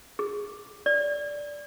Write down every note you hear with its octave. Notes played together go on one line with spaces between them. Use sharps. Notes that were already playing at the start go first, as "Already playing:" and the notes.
G#4
D5